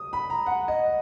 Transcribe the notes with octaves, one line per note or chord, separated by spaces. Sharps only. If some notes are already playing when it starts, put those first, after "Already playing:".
Already playing: D#6
B5
A#5
F#5
D#5